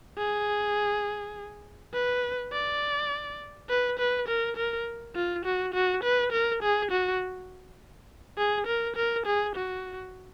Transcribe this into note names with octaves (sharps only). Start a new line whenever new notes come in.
G#4
B4
D5
B4
B4
A#4
A#4
F4
F#4
F#4
B4
A#4
G#4
F#4
G#4
A#4
A#4
G#4
F#4